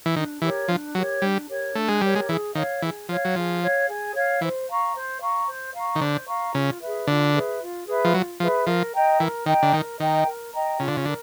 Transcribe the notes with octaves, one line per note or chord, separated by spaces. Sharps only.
E3
D#3 D4
E3 G4 A#4 C#5
F3 D4
F#3 G4 A#4 C#5
G3 D4
G4 A#4 C#5
A3 D4
G#3
G3 G4 A#4 C#5
G#3
E3 G#4
D#3 C#5 F5
E3 G#4
F3 C#5 F5
F#3
F3 G#4
C#5 F5
G#4
C#5 F5
E3 C5
F5 A#5 C#6
C5
F5 A#5 C#6
C5
F5 A#5 C#6
D#3
D3 C5
F5 A#5 C#6
C#3 F4
G#4 B4 E5
D3 F4
G#4 B4 E5
F4
G#4 B4 E5
F3
F#3 F4
F3 G#4 B4 E5
F3 A#4
D#5 G5 A#5
E3 A#4
D#3 D#5 G5 A#5
D3
D#3 A#4
D#3 D#5 G5 A#5
A#4
D#5 G5 A#5
C#3 F4
D3
C#3
D3 A#4